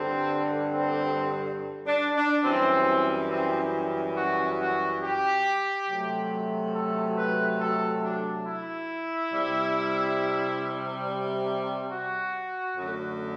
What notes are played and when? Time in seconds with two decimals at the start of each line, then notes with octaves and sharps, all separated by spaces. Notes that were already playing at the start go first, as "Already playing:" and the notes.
Already playing: G2 D3 G3 C4
0.72 C4
1.87 D4
2.16 D4
2.44 F#2 E3 G3 C4
3.30 C4
4.17 F#4
4.59 F#4
5.02 G4
5.88 C3 F#3 A3
6.74 A4
7.17 B4
7.60 A4
8.04 D4
8.46 E4
9.33 C3 G3
11.91 F#4
12.76 F#2 D3 A3